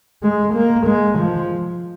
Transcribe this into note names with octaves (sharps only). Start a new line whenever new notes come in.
G#3
A#3
G#3
F3